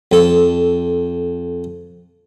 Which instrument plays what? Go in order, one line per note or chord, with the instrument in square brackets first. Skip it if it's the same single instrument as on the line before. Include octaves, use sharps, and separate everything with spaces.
[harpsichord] F2 A4